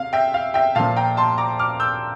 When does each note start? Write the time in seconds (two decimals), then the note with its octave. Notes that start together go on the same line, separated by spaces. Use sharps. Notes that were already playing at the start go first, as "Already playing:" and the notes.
Already playing: C3 F5
0.13 E5 G5
0.34 F5
0.54 E5 G5
0.75 A#2 F3 F5 A5
0.97 G5 A#5
1.17 A5 C6
1.38 A#5 D6
1.59 D6 F6
1.80 E6 G6